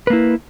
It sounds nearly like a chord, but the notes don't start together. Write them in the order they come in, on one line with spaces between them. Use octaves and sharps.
B4 A#3 E4